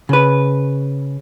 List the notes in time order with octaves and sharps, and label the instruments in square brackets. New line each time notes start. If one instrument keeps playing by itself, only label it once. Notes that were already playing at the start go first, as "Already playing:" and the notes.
[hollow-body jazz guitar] C#3 B4